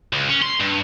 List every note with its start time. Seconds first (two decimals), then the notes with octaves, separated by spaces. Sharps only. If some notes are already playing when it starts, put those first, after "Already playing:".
0.13 C#2
0.29 C#4
0.42 C6
0.60 G2